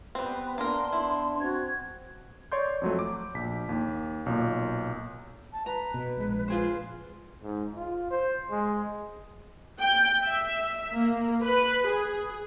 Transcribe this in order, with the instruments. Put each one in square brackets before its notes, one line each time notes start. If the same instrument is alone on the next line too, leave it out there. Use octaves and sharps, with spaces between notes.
[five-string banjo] G3 C4 [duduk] B3 [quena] B4
[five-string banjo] A#3 A#4 [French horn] D4 [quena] C6
[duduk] B3 [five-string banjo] E4
[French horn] C4 [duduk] F#4 [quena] G#6
[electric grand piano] C#5 D5 C6 G6
F2 F#3 A3
D6
A#1 B6
D#2
B1 A#2
[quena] A5
[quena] B4 [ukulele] A#5
[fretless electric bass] B2
A#1 G#3
[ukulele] F4 G#4 C5
[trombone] G#2
F4
C5
G#3
[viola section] G5
E5
A#3
B4
G#4